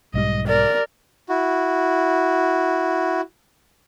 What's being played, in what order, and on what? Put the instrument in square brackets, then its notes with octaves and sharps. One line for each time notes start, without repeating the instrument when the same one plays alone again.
[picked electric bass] B1 G#2 G3 [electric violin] D#5
[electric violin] A#4 [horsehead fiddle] D5
[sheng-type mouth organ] E4 F#4